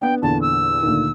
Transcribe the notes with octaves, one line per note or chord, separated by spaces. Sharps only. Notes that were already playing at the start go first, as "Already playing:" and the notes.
B3 D4 G5
E2 A#2 D3 A5
E6
D2 A#2 D#3